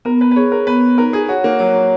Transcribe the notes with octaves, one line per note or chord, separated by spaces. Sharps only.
B3 A#4
B4
B4
G#4 C#5
A#4
B3 B4
D#4 A#4
G#4
F#4 C#5
A#3
F#3 C#5